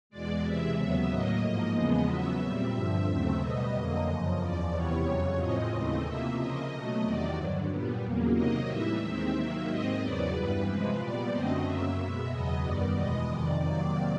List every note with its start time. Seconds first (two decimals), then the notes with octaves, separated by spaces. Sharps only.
0.10 E2 B2 G#3 D5
0.42 C3 E3 G#3 E5
0.75 D#2 C#3 F#3 B3
1.08 A2 F#3 A#3 D#5
1.41 G#2 F3 A#3 D#5
1.74 E2 C#3 F3 G#3 B3 D#5
2.07 C#3 F#3 B3 E5
2.40 A#2 G3 C4
2.74 G2 D3 F3 E5
3.06 D#2 C#3 F#3 A3 C4
3.39 B2 G3 B3 D#5
3.72 F2 D3 F#3 A#3
4.06 F#2 C#3 F3
4.38 E2 C#3 F3 D5
4.71 E2 C3 E3 G3 B3 C#5
5.04 F2 C#3 F#3 C#5
5.37 A2 F3 G#3 C4 D#5
5.71 D#2 C#3 E3 A3 C4
6.03 C3 F3 A#3 E5
6.36 C#3 F3 A#3 D#5
6.69 B2 F#3 A3
7.02 E2 C3 D#3 F#3 D5
7.35 G2 D3 F#3
7.67 A#2 G3 B3
8.02 E2 C#3 F#3 A#3
8.34 C3 D#3 F#3 A#3 D#5
8.67 A2 E3 G3 E5
9.01 D#2 D#3 G#3 C4
9.33 C3 D#3 F#3 A#3
9.66 G#2 D#3 G#3 C4 D#5
9.98 E2 C#3 F#3 B3 D5
10.32 G2 E3 G3 B4
10.65 C3 F3 G#3 C4
10.98 A#2 G3 B3 D5
11.30 F#2 D3 F#3 A3 C4 D#5
11.64 F#2 C#3 F#3 A#3 E5
11.97 B2 G#3 B3
12.30 E2 C#3 F#3 B3 D#5
12.63 F#2 D#3 G3 B3 D5
12.95 E2 B2 G#3 B3 D#5
13.28 F2 C3 D#3 D5
13.61 C3 D#3 F#3 A#3 D5